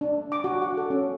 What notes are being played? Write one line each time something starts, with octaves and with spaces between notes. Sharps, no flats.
D4
D6
F#4
F#5
A4
C#4